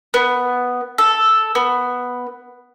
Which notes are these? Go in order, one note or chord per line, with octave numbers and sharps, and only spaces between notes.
B3
A4
B3